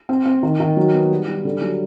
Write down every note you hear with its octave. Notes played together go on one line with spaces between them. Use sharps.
C4
C4
D#3
D#3
F#3
B3
G3
G3
D3
F#3